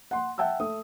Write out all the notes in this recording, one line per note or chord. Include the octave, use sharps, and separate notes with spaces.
F#5 C6
E5 F#5 G5 A5 E6
A3 D#6